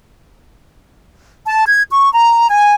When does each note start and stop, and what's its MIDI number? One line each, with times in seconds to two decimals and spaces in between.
1.46 1.64 81
1.67 1.83 92
1.92 2.12 85
2.13 2.47 82
2.50 2.74 80